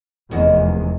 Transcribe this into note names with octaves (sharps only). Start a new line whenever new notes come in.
F1 E2 D#3 G#3 F#4